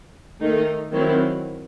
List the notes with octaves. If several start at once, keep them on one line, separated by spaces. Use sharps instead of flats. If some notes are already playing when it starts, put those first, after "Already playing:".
D#3 A3 D#4
D#3 F#3 C4 E4